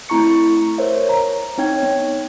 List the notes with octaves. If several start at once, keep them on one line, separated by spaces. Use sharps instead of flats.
A3 C4 E4 A#5 C#6 C#7
A#4 C5 C#5 E5
A#5
C4 D#4 C#5 G5 G#6
B3